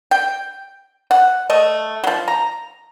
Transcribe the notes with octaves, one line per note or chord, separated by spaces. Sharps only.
G5
F#5
A3 D#5
F3 F#3
A#5